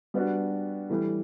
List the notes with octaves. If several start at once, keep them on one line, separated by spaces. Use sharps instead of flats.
G3 B3 D4 F#4
A2 E3 G3